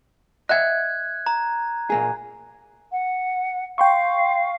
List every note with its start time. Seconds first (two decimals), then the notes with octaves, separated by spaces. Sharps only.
0.49 D#5 E5 F#5 F#6 G#6
1.26 A#5
1.90 A#2 A#3 G#4
2.91 F#5
3.78 F5 G5 C6 C#6